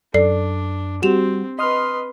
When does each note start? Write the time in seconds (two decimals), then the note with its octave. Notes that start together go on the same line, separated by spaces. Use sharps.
0.14 F#2 D4 A4 D5 C7
1.02 G3 C4 F#4 G4 E7 F7
1.59 B4 D#5 C6 D#6 F6